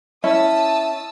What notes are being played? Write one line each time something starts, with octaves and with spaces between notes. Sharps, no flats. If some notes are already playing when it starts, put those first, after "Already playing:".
C#4 E4 E5 A5 D#6 E6